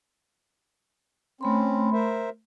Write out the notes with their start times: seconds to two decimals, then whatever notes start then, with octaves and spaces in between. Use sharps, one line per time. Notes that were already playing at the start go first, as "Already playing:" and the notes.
1.41 A3 C4 C#4 B5 C6
1.93 A#4 C5 E5